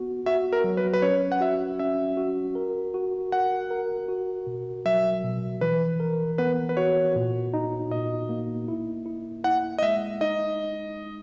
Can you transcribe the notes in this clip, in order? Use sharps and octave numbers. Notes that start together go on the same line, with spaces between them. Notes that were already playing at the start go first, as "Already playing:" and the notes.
Already playing: B3 F#4
F#4 E5
A#4
F#3
B4
B4
C#4 C#5
F#5
F#4 E5
C#4 E5
F#4
A#4
F#4
A#4 F#5
A#4
F#4
B2
F#3 E5
B2
E3 B4
A#4
B3 B4
B4
F#4 C#5
A#2
D#4
A#2 D#5
A#3
E4
E4
E4 F#5
D#5
G#3 E5
D#4 D#5